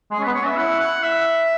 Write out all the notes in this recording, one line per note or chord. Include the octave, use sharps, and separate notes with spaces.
G#3 G#4
C#4
B3 B4
C#5
C#4
E5
E4 F#5
F#5
E5